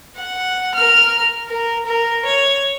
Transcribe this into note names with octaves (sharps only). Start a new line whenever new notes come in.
F#5
A#4 F6
A#4
A#4
C#5